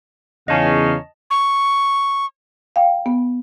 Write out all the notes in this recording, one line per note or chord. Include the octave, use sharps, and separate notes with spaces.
E2 C#3 C#4 D#4 D#5 F5 A5
C#6
F5 G5
B3